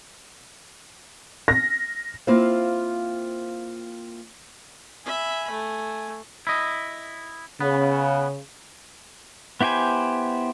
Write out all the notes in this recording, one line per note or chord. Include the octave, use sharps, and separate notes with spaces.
A#6
A#3 C4 E4 F4 C5 F5
E5 G#5 B5
A3
E4 D#5
C#3 B3
B3 E4 G4 C5 G#5